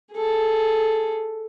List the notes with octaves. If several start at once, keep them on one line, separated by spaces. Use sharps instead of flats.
G#4 A4